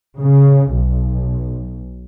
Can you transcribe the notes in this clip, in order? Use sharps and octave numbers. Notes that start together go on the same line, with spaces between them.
C#3
B1